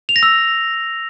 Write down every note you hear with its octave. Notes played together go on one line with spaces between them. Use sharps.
F7
A#6
E6